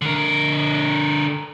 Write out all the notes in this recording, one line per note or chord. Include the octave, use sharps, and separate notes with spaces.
D3 A#4